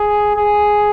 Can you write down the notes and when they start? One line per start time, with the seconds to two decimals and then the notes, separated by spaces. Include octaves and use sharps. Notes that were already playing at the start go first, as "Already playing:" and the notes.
Already playing: G#4
0.36 G#4